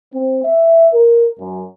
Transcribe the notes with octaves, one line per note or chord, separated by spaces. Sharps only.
C4
E5
A#4
F#2